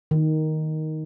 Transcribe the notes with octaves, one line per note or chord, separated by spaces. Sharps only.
D#3